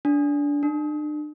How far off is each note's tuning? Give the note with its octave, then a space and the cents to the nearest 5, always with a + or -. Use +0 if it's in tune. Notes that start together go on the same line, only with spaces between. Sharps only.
D4 -20
D4 +40